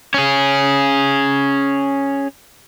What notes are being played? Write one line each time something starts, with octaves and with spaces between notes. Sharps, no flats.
C#4 G#4